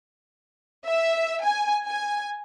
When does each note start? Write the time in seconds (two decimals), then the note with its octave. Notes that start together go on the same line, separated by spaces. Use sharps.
0.86 E5
1.44 G#5
1.86 G#5